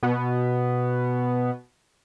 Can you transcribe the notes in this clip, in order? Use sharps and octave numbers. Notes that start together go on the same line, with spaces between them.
B2 B3